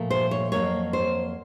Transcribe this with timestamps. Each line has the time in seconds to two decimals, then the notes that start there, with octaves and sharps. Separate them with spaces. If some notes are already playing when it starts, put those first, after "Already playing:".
Already playing: A#2 F3 A3
0.11 C5
0.31 C#5
0.52 F2 C#3 F#3 A#3 C#5
0.93 C5